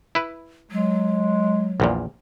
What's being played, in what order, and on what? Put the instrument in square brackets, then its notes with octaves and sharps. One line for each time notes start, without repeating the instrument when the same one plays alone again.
[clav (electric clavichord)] E4 B4
[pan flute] F#3 [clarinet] G#3
[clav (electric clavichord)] A#1 E2 A#2